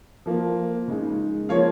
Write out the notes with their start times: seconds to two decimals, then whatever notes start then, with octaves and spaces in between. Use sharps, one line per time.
0.26 F3 A#3 F4
0.88 C#3 G#3 D#4
1.49 F3 A#3 F4 C#5 F5